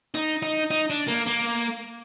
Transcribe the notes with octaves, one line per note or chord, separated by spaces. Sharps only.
D#4
D#4
D#4
D4
A#3
A#3